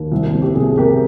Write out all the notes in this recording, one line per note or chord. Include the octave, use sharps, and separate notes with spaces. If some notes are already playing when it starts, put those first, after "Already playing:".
Already playing: D#2
C2
C3
G4
C3 G#4
C3 G4 A#4